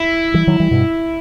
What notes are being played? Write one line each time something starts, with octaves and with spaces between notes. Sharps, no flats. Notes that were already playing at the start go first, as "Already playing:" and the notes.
Already playing: E4
E3 G3
D#3 F#3
E3 G3
G2 B2